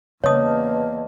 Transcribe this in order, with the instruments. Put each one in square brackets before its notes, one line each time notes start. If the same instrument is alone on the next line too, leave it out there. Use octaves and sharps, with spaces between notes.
[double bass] E2 A#3 [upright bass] C#3 [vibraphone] B4 D#5 A5 [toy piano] C#5 D#6